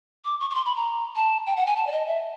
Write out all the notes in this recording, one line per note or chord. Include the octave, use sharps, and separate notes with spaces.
D6
C#6
C#6
C6
B5
A#5
A5
G5
F#5
G#5
A5
D5
D#5
E5